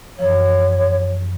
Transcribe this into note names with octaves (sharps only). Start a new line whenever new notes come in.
F#2 E3 F3 C#5